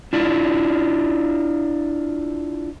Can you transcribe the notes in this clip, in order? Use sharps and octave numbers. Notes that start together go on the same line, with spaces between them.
D4 E4 F4